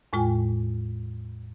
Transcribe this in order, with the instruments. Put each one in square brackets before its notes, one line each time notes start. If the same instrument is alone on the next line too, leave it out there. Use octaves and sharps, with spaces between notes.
[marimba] E2 A2 G#3 F4 G5 G#5